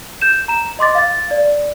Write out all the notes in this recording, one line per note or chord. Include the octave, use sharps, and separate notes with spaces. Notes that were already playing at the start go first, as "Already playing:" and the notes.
G6 E7
A#5 E7
D#5 C6 D6 A6
F5 A6
D5